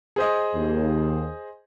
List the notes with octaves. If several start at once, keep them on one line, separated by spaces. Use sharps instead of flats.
G#4 C5 D#5
D#2